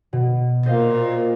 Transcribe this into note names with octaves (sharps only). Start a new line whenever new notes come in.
B2
A#2 C5 D#5 F5